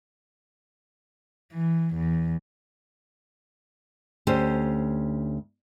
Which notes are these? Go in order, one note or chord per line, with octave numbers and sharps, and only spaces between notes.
E3
E2
D2 C#4 G4 C5